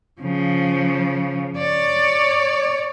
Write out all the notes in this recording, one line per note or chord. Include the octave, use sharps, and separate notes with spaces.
C#3 F3
C#5 D5